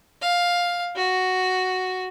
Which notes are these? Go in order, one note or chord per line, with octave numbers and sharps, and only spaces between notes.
F5
F#4